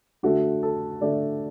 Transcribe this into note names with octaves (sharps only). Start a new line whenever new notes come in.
D3 A3 F#4
A4
D3 A3 D5